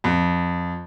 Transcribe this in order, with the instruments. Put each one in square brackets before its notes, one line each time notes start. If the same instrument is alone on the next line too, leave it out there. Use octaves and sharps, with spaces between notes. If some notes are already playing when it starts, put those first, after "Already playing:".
[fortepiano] F2